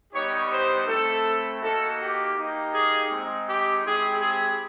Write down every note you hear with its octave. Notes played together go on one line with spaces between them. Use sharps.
G3 B3 D#4 G4 C#5
C5
A3 C4 E4 A4
A#3 D#4 F#4 A4
G4
A#3 D#4 G4
G#4
G#3 C4 D#4
G4
G#3 C4 E4 G4 G#4
G#4